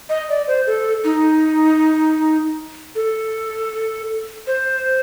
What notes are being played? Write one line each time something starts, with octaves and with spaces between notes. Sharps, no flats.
D#5
D5
C5
A4
D#4
A4
C5